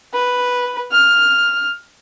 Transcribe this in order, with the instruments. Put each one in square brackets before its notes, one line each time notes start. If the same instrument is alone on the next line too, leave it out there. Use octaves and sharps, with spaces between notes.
[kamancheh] B4
F6